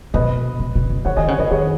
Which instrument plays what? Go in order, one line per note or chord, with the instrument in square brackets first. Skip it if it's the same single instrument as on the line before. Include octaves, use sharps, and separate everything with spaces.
[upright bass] B2 [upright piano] B4 D#5
[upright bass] B2
B2
C#3
[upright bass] D#3 [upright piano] C#5 F#5
[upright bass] D#3 [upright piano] D#5 G#5
[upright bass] C#3 [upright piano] C#5 F#5
[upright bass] C#3 [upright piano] B4 D#5
[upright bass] D#3 [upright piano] G#4 C#5